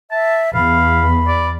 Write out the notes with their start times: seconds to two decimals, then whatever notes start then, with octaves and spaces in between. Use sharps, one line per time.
0.11 E5 A5
0.55 E2 F5 B5
1.28 D5